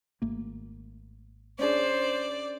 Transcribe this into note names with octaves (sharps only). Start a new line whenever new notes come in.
G#1 A3 A#3
C#4 D4 G#4 C5 D5